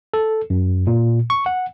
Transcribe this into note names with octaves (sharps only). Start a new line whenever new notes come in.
A4
F#2
A#2
C#6
F#5